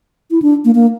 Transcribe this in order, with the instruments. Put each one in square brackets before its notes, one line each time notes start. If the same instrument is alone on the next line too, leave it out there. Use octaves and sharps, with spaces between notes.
[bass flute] E4
D4
A#3
A#3